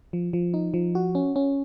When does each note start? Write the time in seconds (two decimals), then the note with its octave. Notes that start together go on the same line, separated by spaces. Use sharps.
0.13 F3
0.33 F3
0.54 D#4
0.74 F3
0.95 F#4
1.15 C#4
1.36 C#4